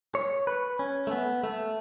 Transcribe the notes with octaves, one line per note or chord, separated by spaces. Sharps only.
C#5
B4
C#4
A3
B3
A3